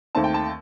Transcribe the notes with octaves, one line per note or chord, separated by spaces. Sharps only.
D#2 D#3 A3 C4 A5
G5
A5